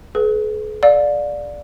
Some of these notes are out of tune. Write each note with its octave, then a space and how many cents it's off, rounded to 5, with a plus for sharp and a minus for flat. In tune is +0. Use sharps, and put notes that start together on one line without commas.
G#4 +45 B4 +0
D5 +0 F5 +35